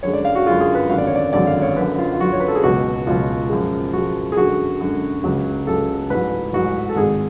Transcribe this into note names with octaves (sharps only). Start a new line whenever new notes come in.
F#2 D3 G#3 C#5
D5
F5
F#4
F#2 D3 G#3 F4
G#4
B4
G#1 F#2 D3 F#3 F5
D5
C#5
D5
G#1 F#2 D3 F#3 D5
F5
C#5
F#2 D3 F#3 B4
F4
F4
F#2 D3 F#3 F#4
C#5
B4
A4
G#4
C#2 B2 F#3 F#4
C#2 B2 F#3 F4
F#2 F3 G#3
F#2 F3 G#3 F#4
G#4
F#2 D3 G#3 F#4
F#2 D3 G#3
C#2 C#3 F#3
C#2 C#3 F#3 A4
A1 G#2 F#3 B4
A1 G#2 F#3 F#4
A4
G#1 G#2 G#3 G#4